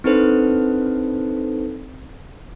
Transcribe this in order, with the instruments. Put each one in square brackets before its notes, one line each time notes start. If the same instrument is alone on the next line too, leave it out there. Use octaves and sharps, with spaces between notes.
[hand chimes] C4 D4 D#4 A4 B4 C5